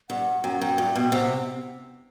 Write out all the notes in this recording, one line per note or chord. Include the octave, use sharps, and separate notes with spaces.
G2 F#5
F#2 G5
F#5
F#2 G5
G2
B2
C3 F#5